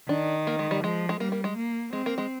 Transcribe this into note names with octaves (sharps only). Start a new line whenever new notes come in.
D#3 D4
A#3
G#3
G3
F3 G#3
G#3
G3 A#3
A#3
G#3
A#3
G#3 C4
A#3
G#3